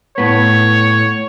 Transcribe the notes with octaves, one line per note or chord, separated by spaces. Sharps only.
A2 B3 C#5